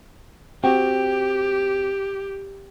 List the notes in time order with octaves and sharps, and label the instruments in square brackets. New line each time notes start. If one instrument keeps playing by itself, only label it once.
[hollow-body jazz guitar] C4 F#4 [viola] G4 [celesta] G5